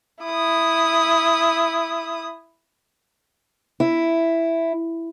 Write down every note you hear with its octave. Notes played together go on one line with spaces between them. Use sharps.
E4 D#6
E4